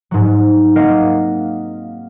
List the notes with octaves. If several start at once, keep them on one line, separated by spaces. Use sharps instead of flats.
G#2 F#3
A#3 C4 A#4 D#5 F5 F#5